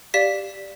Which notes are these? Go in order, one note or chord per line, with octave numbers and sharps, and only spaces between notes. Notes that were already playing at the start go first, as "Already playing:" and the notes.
G4 D5 F5 B6